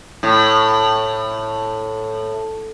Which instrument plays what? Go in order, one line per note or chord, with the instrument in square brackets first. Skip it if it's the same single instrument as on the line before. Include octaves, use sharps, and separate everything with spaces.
[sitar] A2